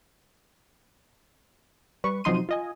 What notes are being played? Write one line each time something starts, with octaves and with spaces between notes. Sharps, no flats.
G3 B4 C#6
C3 F3 F#3 D#4 C6 D#7
F4 D#5 G#5